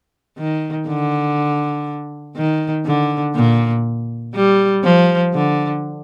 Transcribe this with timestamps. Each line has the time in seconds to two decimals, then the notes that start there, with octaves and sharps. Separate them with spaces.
0.38 D#3
0.88 D3
2.37 D#3
2.86 D3
3.35 A#2
4.35 G3
4.84 F3
5.34 D3